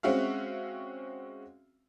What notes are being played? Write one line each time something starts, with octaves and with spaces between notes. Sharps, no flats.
G#3 C4 C#4 F#4 E5 F5